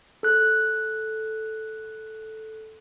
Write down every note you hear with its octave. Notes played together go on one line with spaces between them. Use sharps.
A4 F#6